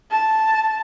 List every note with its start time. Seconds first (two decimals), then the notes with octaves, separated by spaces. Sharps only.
0.11 A5